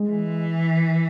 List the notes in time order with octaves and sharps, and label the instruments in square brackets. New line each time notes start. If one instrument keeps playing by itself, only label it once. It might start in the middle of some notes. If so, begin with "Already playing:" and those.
Already playing: [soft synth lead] G#3
[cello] E3